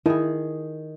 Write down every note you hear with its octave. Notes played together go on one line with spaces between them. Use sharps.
D#3 E4 G#4